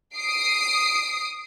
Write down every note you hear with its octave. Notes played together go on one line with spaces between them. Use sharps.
D#6 C7 D7